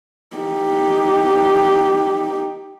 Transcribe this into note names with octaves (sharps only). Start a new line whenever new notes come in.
D#4 G4